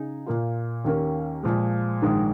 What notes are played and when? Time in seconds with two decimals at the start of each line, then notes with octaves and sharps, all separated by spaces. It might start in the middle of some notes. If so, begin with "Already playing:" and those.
Already playing: C#3 D#4 G#4
0.26 A#2 A#3 F4
0.84 D#2 D#3 A#3 C#4 A#4
1.43 A#2 F3 G#3
2.02 A#1 G#2 D#3 G#3